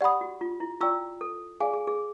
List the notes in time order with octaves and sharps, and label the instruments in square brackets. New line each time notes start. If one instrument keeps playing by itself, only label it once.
[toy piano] G4 [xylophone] D5 F#5 B5 D#6
[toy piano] F#4
F4
E4
[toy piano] F4 [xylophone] D5 G5 A#5 C#6 E6
[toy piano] A4
[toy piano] G#4 [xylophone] D5 F5 G#5
[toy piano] G#4
G#4